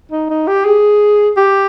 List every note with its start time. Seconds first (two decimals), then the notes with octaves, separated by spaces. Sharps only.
0.11 D#4
0.30 D#4
0.48 G4
0.65 G#4
1.37 G4